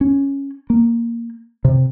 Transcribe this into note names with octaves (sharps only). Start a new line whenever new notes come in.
C#4
A#3
C3